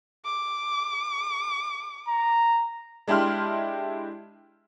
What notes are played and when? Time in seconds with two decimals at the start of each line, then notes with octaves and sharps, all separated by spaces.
0.25 D6
2.08 A#5
3.08 G#3 D4 E4 G4 C6 F6